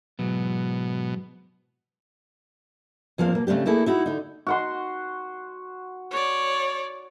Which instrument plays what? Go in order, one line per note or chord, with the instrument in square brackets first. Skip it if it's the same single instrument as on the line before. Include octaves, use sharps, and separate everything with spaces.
[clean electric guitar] G#2 E3 F#3 [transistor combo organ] B2
[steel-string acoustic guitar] E2 F3 A#3 C4 F5
B2 A#3
C#3 A3 C4 D4 G4
A3 A#3 D#4 E4 G#4 A4
D#4 E4 F#4
D3 D#4
[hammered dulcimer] F#4 F#5 C6
[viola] C#5 D5